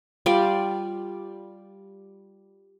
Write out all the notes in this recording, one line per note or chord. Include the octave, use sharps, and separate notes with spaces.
G3 F4 D5